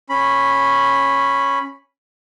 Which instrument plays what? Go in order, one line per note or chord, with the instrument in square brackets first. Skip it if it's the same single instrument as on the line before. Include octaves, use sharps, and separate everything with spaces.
[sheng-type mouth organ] C#4 B5